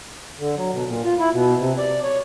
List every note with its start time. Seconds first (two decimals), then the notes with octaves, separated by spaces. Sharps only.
0.39 D3
0.57 F#3
0.73 B2
0.87 A#2
1.05 F4
1.19 E4
1.33 B2
1.59 C3
1.78 D5
2.03 C#5